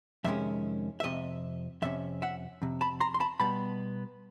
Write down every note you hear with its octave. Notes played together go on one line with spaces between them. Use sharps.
F2 C3 D#3 G#3 C#4 E5
E5
F2 C3 D#5
F2 C3 C#4 E5
E5 F#5
F2 C3
A5 B5
A#5 C6
C6
A5 B5
B2 G3 B3 A5 B5